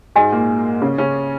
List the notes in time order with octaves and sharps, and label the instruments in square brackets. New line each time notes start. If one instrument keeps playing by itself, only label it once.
[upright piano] G#2 G#3 [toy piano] F#4 D#5 G#5
[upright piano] A#2 A#3
C#3 C#4
C#3 C#4